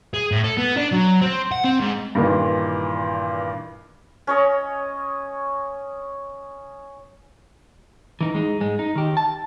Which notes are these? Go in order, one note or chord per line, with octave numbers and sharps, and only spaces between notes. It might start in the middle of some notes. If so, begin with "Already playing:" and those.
G#4
A2
A4
B3
D4
F#3
C4
F#5
C4
G#2
G2 A#2 D#3 E3
C#4 C#5 D#5
E3 D#4
G#3 D#4
G#2 G#3
D#4
D#3 G4
A5